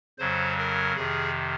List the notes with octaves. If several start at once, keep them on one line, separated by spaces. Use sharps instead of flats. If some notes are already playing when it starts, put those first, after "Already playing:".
F2 C#3 F#3 C5
A#4
F2 C3 D#3 G#4